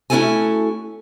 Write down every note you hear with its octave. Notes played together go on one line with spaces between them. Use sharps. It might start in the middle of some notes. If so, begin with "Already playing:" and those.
A3 C#4 E4 F#4 A4 G#5